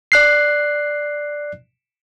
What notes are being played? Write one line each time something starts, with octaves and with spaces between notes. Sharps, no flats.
D5 F#6 C7